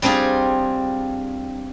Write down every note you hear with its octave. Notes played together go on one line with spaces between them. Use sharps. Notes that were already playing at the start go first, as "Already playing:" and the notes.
G3 C4 D4 F4 G#4